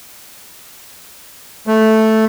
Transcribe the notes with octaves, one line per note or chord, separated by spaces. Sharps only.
A3